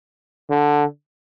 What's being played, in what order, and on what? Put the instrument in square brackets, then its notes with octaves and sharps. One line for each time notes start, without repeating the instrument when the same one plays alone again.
[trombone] D3